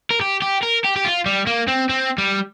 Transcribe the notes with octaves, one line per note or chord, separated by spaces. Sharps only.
A#4
G4
G4
A#4
G4
G4
F4
G3
A#3
C4
C4
G3